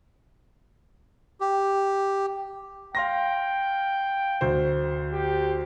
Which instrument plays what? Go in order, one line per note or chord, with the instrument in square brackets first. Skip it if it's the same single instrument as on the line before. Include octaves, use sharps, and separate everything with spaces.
[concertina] G4
[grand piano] F5 C6 A#6 [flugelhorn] G5
[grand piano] D2 C5
[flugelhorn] G4